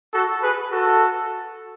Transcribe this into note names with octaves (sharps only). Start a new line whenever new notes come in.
F#4 A4
G#4 B4
F#4 A4